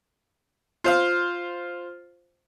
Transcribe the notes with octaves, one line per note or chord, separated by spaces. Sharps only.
F4 C5 F5